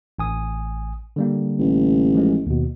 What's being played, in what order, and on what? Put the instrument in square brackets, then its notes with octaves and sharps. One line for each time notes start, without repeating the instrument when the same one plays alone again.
[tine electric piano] A1 G#5 D#6
D3 G3 A#3
[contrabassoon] A1
[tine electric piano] F3 G#3
D#2 B2